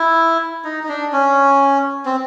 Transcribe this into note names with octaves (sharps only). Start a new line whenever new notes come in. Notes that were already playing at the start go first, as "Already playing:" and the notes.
Already playing: E4
D#4
D#4
D4
C#4
C4